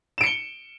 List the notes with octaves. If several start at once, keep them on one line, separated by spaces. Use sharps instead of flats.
C#7 D7 E7 G7